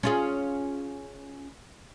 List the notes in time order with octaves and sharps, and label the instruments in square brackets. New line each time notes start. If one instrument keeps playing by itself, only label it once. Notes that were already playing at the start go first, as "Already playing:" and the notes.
[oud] C#4 F4 G#4